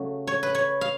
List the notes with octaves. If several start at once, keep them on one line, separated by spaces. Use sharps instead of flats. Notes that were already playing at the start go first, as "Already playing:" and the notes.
Already playing: C#3 F#3 A3
C#5
B4
C#5
F5